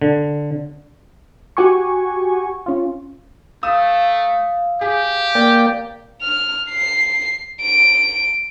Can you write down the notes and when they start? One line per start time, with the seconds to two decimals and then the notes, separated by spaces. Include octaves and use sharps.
0.02 D3
1.57 F#4 G4 G#5 C#6
2.66 C#4 F4
3.63 A3 F5 D#6 E6
4.81 G4 G#4
5.35 A#3 D5 G5
6.22 F6
6.70 C7
7.62 D7